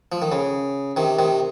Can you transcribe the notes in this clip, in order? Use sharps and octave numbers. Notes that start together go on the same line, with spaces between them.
F3
D#3
C#3
C3 D#3
C3 D#3